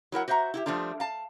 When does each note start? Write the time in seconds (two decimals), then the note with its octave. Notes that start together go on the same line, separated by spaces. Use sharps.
0.12 F#3 E4 A#4 F#5
0.28 F#4 C5 E5 F#5 A#5
0.54 E4 F4 G4
0.66 F3 G3 A3 D4 F4
1.00 F5 A5